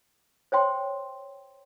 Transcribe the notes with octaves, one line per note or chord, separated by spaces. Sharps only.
C5 C#5 G5 C6